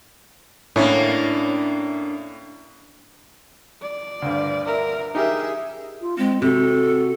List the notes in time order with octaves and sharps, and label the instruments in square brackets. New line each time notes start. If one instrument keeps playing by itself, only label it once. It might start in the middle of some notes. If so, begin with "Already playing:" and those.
[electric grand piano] A2 E4 [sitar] A#3 D4 [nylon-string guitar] C#4
[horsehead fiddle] D5
[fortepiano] D2 G2
[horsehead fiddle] A#4 E5
[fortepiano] D#4 G4 A#4 [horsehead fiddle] G#4 E5
[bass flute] F4
[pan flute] G#3 [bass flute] C4
[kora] C3 [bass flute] F#4 [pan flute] A4